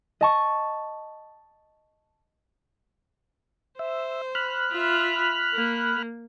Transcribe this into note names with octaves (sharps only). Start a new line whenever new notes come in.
D#5 A5 C#6
C5 E5
B5 F6 F#6
F4 E5
A#3